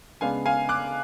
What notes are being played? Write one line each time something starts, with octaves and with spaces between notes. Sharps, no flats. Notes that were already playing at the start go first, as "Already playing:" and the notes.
C#3 G#3 B3 D4 F5 G#5
F5 G#5
D6 F#6